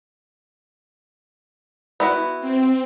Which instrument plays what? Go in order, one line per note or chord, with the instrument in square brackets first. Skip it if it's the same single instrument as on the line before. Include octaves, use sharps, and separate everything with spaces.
[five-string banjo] B3 E4 F#4
[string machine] C4